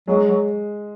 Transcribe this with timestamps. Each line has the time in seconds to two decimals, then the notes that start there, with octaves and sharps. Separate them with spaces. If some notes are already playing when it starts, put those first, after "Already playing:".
0.07 F#3 G#3
0.28 F#3